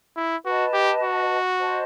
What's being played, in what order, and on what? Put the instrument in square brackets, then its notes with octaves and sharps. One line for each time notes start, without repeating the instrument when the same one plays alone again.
[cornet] E4
[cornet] F#4 [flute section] B4 D#5 A5
[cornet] G4
F#4
[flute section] C5 D#5 A5 C6